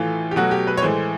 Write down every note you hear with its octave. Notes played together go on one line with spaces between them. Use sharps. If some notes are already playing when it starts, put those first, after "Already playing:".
Already playing: A2 E3 A3 F4
G4
B2 F#3 A3 F#4
G4
B4
C#5
A2 E3 G#3 C5